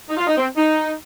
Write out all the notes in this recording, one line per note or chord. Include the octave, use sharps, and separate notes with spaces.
D#4
F4
D#4
C4
D#4